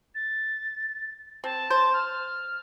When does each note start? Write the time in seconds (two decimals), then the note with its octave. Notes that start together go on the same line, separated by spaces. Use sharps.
0.14 A6
1.44 C4 A5
1.70 C5
1.93 F6